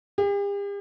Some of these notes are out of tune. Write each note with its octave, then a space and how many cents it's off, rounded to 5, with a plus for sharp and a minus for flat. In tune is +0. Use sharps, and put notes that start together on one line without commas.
G4 +45